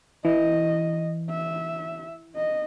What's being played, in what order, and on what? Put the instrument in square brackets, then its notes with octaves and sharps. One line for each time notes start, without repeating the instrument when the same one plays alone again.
[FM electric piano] E3 [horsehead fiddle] D#5
[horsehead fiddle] E5
D#5